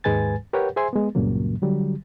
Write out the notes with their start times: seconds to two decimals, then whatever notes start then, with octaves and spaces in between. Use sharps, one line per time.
0.04 D#2 G#2 G#3 B4 G#5 A6
0.53 G4 A#4 B4 C#5 F#5 G5
0.76 G#4 C5 E5 G#5 C6
0.93 G#3 B3
1.15 C#2 G2 A#2 C#3 F#3 A#3
1.62 D3 F#3 G3